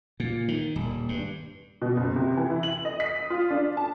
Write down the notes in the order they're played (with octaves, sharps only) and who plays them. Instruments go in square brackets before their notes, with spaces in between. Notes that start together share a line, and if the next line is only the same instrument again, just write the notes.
[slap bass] A#2
D#3
D#1
G2
[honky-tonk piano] B2
F#1
C3
E3
E4
F#7
D#5
B6
D#6
F4
D4
A5